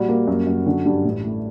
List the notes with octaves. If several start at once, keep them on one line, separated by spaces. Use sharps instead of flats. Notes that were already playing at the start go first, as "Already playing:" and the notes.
Already playing: A#1 G3 F#4
A#3
F#2
F#2
D3 F#4
G2 G4
A1
A2